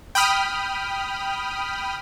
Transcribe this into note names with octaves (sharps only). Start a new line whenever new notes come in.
G5 B5 D#6 F6